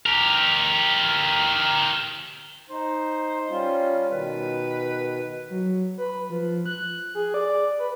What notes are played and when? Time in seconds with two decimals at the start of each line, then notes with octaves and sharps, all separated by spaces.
0.06 G4 A#4
2.70 D#4 C5
3.49 G3 C#4 F4
4.12 B2 D#3 B4
5.50 F#3
5.98 B4
6.30 F3
6.66 F#6
7.15 G#4
7.34 D5
7.79 B4